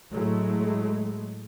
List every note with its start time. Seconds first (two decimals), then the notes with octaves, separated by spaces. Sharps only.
0.12 A2 F#3 G#3 A3